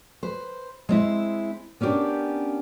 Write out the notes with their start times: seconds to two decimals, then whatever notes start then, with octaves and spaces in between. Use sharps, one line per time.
0.23 B4 C5
0.89 G#3 C4 E4
1.81 B3 C#4 D4 G4 A#4